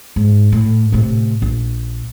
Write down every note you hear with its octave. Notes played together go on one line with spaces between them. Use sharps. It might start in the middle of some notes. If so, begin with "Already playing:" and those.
G#2
A2
A2 C3
A#1